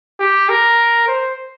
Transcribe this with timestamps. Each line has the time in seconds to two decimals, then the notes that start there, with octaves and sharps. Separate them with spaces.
0.20 G4
0.49 A#4
1.08 C5